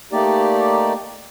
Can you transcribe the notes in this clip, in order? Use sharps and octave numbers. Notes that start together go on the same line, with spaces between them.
A3 A#3 D#4 G4 D5